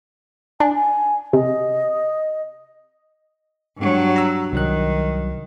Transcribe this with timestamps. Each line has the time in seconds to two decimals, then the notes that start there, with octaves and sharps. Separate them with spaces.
0.60 D4 G#5
0.75 G#5
1.33 C3 D#5
3.77 G2 F#3
4.16 A#5 E6
4.53 C2 D#3 F#3 F#6